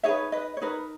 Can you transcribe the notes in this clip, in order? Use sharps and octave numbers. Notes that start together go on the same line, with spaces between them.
D#4 G#4 B4 C#5 E5
B4 D#5
C#5
D#4 A#4 B4